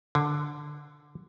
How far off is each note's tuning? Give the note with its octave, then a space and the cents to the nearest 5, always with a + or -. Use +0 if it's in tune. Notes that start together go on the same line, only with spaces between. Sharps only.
D3 +5